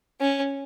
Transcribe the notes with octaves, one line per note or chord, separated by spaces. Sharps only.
C#4